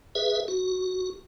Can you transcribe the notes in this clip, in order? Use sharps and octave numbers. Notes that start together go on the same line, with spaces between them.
G#4 B4 E5
F#4